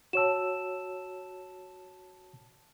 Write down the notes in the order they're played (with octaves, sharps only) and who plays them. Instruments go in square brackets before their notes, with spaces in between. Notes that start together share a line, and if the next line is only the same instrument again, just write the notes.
[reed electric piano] F#4 C#5 E6 [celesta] A5 E7